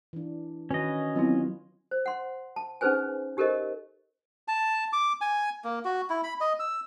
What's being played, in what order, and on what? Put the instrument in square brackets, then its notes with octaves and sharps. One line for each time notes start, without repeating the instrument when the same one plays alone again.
[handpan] E3 D4
[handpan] D#3 F#4 B4 [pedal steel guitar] C#4 D#5
[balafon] F#3 C4 E4 [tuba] B3 [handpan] F4
[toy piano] C5
F#5 C6
A5
C#4 D#4 G#4 B4 C5 G#5
D#4 G4 A4 A#4 C5 D#5
[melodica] A5
D6
G#5
A#3
F#4
E4
B5
D#5
E6